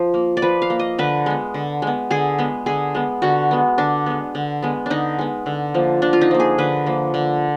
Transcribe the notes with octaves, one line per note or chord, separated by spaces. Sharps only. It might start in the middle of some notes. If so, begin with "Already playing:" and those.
Already playing: F3
A#3
D5
F3 B4
F5
A#3
D#5
D3 B4
G#3 B3
D3
G#3 B3
D3 G#4
G#3 B3
D3 G#4
G#3 B3
D3 F#4
G#3 B3
D3 D4
G#3 B3
D3
G#3 B3
D3 D4 D#4
G#3 B3
D3
F3 A#3
D3 D4
F4
D#4
F3 A#3
G#4
D3 B4
F3 A#3
D3